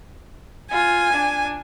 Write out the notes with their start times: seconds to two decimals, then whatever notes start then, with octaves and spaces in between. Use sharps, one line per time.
0.71 F4 G#5
1.13 D4